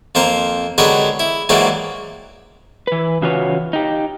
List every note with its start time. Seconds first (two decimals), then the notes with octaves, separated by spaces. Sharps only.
0.15 F2 A#3 C5 A#5
0.78 D3 F#3 G#3 G4 A#4 B4
1.20 E4
1.49 G#2 E3 F#3 A#3 G4 D5
2.87 E3 B4
3.22 C#3 E3 F4 F#4 B4 C#5
3.73 D#4 G4